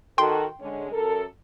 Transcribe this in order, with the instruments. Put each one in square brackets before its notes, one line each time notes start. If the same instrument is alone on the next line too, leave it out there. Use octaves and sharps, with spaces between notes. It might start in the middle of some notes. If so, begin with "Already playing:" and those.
[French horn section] D#3 F#4 A4 [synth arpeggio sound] G5 C6
[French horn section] D3 G#3 C#4
F#2 A4 A#4